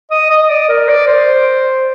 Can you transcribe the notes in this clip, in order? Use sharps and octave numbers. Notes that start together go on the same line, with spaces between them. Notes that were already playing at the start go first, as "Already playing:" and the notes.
D#5
D#5
D5
A#4
D5
C5